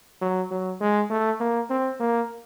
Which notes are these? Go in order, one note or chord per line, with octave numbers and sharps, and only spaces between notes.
F#3
F#3
G#3
A3
A#3
C4
A#3